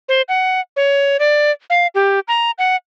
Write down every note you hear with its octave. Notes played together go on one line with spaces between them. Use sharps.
C5
F#5
C#5
D5
F5
G4
A#5
F#5